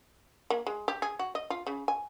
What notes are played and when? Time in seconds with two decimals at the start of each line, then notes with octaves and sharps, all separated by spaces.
0.50 A#3
0.67 G#3
0.88 G4
1.02 G#4
1.19 F#4
1.35 D#5
1.50 F4
1.67 C#3
1.88 G#5